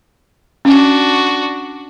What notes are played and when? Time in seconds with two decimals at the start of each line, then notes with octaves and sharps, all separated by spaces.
0.65 C#4 D4 F#4